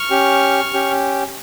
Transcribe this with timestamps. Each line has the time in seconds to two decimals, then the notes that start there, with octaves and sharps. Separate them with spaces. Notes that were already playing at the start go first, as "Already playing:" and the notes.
Already playing: C#6 F6
0.10 C#4 G4
0.74 C#4 G4